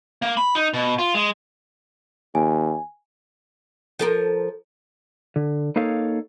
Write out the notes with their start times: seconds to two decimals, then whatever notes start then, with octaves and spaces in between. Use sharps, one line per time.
0.22 A#3
0.37 B5
0.55 D#4
0.74 B2
0.98 F4
1.15 G#3
2.35 D#2 G#5
3.99 F3 A4 A#4
5.36 D3
5.76 A#3 D#4 A4 C#5 F5